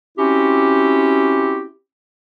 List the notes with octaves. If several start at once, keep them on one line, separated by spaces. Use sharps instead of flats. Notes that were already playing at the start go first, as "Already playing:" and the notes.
C4 C#4 E4 F#4 G4